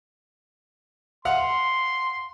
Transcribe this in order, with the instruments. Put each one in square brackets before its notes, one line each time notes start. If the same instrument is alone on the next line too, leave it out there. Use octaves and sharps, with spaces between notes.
[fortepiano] F5 F#5 [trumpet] C6